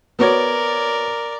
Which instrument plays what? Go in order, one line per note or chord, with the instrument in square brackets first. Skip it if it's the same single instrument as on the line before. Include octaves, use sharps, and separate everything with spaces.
[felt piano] B3 F#4 C#5 [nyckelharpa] A#4 D5